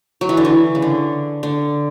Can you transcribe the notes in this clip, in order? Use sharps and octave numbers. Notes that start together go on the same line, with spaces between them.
F#3
E3
D3
E3
C#3
D3
D3